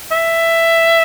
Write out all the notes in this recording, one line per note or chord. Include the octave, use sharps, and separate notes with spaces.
E5